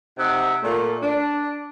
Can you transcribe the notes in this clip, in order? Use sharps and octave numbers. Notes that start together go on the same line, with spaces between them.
C3 D#4 D#5 E5 F#5
A#2 A3
D4